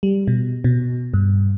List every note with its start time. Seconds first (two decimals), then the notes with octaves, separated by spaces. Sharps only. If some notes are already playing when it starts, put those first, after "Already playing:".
0.03 G3
0.27 B2
0.64 B2
1.14 G2